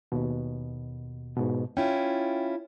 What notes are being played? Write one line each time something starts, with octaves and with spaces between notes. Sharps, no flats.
D#2 B2
G#2 B2
C#4 E4 F4 G5